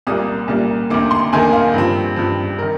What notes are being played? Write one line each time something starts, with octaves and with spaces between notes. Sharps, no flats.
C2 A#2 G3 A#3 D#6
C2 A#2 G3 A#3
D2 C3 D#3 A#3 D6
C6
D2 C3 D#3 A#3 G#5
F5
G2 F3 C4
G2 F3 C4
D#3 A#4